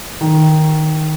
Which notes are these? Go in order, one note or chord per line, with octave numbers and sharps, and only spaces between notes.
D#3